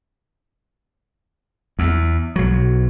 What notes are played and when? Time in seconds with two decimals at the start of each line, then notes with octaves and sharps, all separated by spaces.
1.79 E2
2.36 B1 F#3